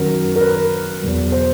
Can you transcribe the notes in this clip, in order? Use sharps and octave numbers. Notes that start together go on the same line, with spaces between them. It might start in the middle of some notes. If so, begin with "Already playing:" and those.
Already playing: F#2 D#3 F#3 A#4
A#4
B4
E2 B2 F#3
C5